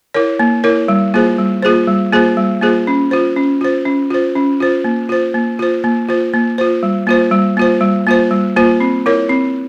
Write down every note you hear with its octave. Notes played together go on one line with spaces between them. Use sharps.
E4 A#4 C#5
A#3
E4 A#4 C#5
G3
A#3 F4 G#4 C5
G3
A#3 F4 G#4 C5
G3
A#3 F4 G#4 C5
G3
A#3 F4 G#4 C5
C#4
F4 C5
C#4
F4 C5
C#4
F4 C5
C#4
F4 C5
A#3
F4 C5
A#3
F4 C5
A#3
F4 C5
A#3
F4 C5
G3
A#3 F4 C5
G3
A#3 F4 C5
G3
A#3 F4 C5
G3
A#3 F4 C5
C4
E4 A#4 C#5
C4